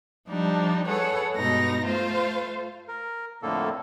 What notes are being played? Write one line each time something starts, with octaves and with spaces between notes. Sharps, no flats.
F3 G3 D4 D#4
G#4 A4 B4 C#5 F#5
G2 B2 G#3 D#4 A#6
A3 F4 C5 F5
A#4
F2 A2 D3 A#3 A4